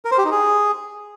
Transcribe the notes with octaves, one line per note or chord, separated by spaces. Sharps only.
A#4
C5
G4
D#4
G#4